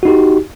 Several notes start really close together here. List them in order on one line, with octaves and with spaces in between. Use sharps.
F#4 D#4 G4